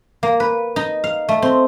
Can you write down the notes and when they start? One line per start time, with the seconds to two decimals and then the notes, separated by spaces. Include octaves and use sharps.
0.23 A#3
0.40 B4
0.76 D#4
1.04 F5
1.29 A3
1.42 C4